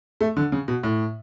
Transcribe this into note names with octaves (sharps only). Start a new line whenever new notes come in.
A3
D3
C#3
B2
A2